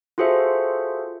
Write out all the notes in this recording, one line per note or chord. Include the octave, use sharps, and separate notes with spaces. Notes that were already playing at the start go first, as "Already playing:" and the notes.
F4 F#4 G#4 A4 C5 E5